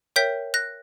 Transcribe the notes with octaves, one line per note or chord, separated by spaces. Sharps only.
A#4 C#5 E5 G5 G6 B6
F#6 A#6